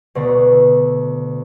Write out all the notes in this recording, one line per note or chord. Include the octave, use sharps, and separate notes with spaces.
D2 B2 D3